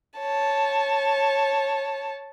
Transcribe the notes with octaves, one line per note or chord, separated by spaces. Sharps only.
C#5 A5